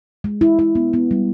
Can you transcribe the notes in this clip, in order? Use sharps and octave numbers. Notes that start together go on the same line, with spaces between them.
G#3
E4
E4
B3
B3
G3